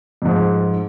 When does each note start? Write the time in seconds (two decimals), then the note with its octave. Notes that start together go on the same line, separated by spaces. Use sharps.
0.22 F2 G#2